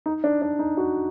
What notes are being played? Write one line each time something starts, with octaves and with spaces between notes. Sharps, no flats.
D#4
D4
D4
D#4
F#4